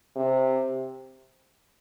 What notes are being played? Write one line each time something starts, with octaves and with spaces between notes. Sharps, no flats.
C3